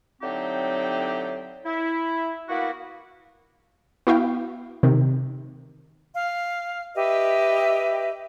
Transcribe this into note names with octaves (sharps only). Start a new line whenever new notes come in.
A2 D3 F#3 C4 D#4 G4
E4
A#3 B3 E4 F#4
B3 E4 F#4 F5 G5
C3 D#3
F5
G4 B4 D#5 E5